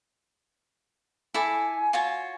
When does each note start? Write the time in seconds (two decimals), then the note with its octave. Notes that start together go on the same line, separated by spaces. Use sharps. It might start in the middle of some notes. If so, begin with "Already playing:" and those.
1.34 E4 A4 G#5 D6
1.93 F4 F#4 C#5